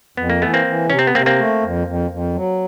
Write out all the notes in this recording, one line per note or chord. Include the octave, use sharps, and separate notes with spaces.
F2 B3
A#3
E3 A3 B3
A#3 C4
E3
C3 C#4
C4
B3
C3 A#3 C4
A#3 C4
A3
F2
F2
F2
F#3